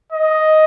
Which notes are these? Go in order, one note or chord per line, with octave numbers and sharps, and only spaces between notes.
D#5